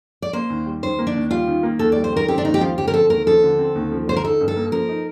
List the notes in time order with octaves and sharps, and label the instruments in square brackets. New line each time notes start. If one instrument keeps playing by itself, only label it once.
[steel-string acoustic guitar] D5
[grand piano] A#3 [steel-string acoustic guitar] C5
[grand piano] D#2
G3
[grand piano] D#3 [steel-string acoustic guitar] C5
[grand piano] A#3
[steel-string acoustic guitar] D4
[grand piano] D#2
[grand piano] G3 [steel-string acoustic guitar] F4
[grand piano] D#3
A#3
[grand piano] D#2 [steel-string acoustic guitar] A4
[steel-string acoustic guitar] D5
[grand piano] G3
[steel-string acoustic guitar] C5
[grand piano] D#3 [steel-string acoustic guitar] A#4
[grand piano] C4 [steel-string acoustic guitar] G4
[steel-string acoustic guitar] D4
[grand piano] D#2 [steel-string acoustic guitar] D#4
[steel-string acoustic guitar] G4
[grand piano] F3 [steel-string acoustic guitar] F4
[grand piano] D3 [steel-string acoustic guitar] G4
[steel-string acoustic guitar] A#4
[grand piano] C4 [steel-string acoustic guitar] A4
[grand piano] D#2 [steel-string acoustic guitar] A#4
[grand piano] F3 [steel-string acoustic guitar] A4
[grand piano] D3
C4
D#2
F3
[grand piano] D3 [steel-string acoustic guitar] C5
[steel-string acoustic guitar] A#4
[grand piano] D#4 [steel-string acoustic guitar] A4
[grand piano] G2
[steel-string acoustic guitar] A4
[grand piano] A#3
[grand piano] F3 [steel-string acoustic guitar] A#4
[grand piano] D#4